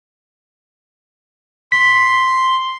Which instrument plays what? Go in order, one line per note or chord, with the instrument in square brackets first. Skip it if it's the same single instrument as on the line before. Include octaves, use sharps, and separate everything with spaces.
[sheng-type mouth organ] C6 [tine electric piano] B6